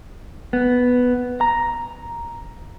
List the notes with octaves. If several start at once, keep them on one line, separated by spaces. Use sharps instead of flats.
B3
A#5